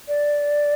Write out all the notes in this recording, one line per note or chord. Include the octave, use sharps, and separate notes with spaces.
D5